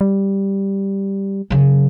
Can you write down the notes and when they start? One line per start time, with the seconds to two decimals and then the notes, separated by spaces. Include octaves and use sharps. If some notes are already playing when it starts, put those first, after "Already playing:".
0.01 G3
1.50 C#3 F#3